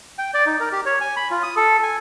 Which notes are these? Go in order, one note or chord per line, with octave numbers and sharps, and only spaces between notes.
G5
D5
D#4
A#4
G4
C#5
G#5
B5
F4
D#6
A4
G#5